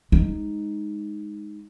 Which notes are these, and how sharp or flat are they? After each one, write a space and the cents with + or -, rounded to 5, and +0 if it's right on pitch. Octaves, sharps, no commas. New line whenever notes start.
G#3 +0 D#4 +0